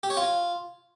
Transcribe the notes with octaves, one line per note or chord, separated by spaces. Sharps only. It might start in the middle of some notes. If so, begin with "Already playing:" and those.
G4
C#5
F4